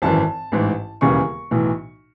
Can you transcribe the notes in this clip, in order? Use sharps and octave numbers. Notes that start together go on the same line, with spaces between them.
G#1 F#2 E3 A5
A1 G#2 E3
E1 D#2 C#3 E3 C#6
B1 A2 E3